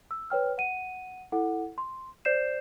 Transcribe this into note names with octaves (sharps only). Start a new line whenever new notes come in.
E6
B4 C#5 G5 F6
F#5 D#7
E4 A4 F#5
C6
C5 D5 G6 C7 E7